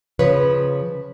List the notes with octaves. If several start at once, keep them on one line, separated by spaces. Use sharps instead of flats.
C#3 F3 B4 C#5